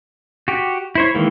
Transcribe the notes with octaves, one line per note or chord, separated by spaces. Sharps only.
F#4 G4
E4 C5 C#5
D#3 E3 G#3 A#3